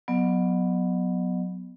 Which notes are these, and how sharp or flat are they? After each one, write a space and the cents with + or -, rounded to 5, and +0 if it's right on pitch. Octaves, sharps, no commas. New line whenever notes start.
F#3 -20 B3 +0 D#5 -40